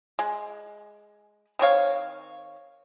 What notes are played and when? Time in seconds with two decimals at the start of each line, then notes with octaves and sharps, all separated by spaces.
0.19 G#3
1.59 D#3 C4 C#5 F5